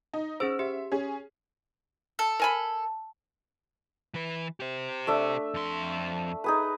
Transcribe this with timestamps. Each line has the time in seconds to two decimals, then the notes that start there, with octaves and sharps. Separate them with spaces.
0.14 D#4
0.40 C#4 G#4 C5 E6
0.59 G4 E5
0.92 C#4 G#4
2.19 A4
2.40 A#4 G#5 B5
4.14 E3 B4
4.60 G4 C5
5.07 A3 D4 E5
5.54 F2 C6
6.44 D#4 G#4 B4